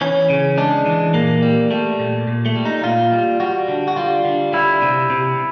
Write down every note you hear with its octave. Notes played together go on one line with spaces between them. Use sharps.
E3 C#4
C#3
G#3 D4
E3
A#2 A#3
G3
G3 A3
A#2
A#2
A3
G3
D#4
A#2 F4
G3
G3 F#4
D3
F#4
G3 F4
D3
G3 E4
C3
C3